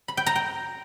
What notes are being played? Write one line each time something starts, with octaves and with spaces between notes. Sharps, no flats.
B5
G5
A#5
G5